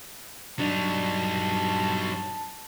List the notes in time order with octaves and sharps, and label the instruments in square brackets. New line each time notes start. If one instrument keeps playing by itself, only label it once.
[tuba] G2 [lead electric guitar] F#3 D#4 [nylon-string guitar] D4 [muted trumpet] A5